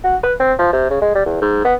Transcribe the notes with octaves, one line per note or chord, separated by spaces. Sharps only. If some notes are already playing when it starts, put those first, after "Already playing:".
F#4
B4
C4
F3
C3
C#3
G#3
G3
E2
G#2
B3